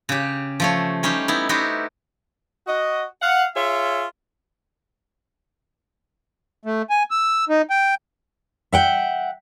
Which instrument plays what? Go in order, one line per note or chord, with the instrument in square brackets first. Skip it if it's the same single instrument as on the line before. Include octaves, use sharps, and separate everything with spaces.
[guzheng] C#3 G4
F3 A3 C#5
G3 C#4 D#4 G4 C5
B3 D#4 E4
B3 D#4 E4 F#4 G4 C5
[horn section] F#4 D#5
F5 F#5
F4 G#4 C#5 E5
[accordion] A3
G#5
E6
D#4
G5
[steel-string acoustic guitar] E5 F#5 G5